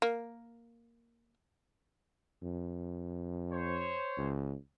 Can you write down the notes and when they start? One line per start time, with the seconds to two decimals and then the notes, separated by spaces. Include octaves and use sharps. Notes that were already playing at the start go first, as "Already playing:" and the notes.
0.02 A#3
2.43 F2
3.51 C5 C#5
4.18 C#2